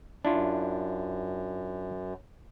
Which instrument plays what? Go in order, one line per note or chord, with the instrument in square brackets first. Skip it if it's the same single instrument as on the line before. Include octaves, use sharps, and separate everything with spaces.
[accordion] F#2 [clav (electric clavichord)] D4 E4 F4